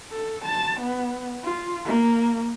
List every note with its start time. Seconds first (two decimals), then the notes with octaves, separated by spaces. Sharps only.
0.11 A4
0.45 A5
0.81 B3
1.43 F4
1.85 A#3